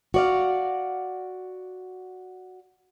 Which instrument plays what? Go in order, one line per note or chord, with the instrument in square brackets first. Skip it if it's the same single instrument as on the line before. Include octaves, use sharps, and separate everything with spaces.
[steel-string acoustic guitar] F#4 D5 F5